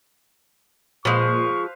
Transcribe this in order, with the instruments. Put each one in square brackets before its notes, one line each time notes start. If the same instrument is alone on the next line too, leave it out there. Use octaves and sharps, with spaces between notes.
[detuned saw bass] A#2 [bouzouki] F3 G#3 [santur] B4 C5 F5 [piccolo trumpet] C#6